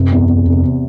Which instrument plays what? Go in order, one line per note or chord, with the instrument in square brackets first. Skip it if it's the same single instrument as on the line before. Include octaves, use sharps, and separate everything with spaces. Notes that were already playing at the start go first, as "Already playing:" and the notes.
Already playing: [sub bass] F#2 [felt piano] C3
[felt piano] E2
C3
[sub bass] F2 [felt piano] C3
[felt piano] C3